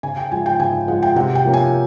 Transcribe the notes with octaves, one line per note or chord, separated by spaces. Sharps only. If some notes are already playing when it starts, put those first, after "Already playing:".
C#3 G#5
G5
F3 G#3 G#5
G5
C#3 G#5
F3 G#3 F#5
G5
C3 F#5
G5
F3 A#3 C#4
G#5